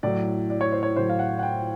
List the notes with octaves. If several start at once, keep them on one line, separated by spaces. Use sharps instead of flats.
A2 F#3 D5
D5
C#5
C5
C#5
A2 F#3 C5
F5
F#5
F#5
G5